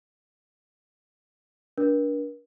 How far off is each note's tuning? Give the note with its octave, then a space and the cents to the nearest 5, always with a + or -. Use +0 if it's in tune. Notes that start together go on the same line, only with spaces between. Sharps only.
D4 -20 A#4 +45